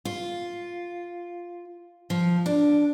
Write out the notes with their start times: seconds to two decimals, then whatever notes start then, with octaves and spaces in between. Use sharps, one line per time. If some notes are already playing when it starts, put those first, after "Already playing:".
0.05 F4
2.10 F3
2.46 D4